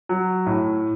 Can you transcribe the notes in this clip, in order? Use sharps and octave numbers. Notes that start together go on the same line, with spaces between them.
F#3
A2